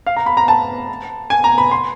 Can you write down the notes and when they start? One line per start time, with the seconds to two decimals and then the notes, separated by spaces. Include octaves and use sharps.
0.07 F5
0.17 A#5
0.26 B5
0.37 A#5
0.48 A5
1.30 G#5
1.44 A#5
1.58 B5
1.71 C6